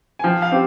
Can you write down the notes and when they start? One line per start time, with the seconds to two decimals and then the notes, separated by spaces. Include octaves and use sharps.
0.19 G#5
0.24 F3 G5
0.42 F5
0.52 C4 G4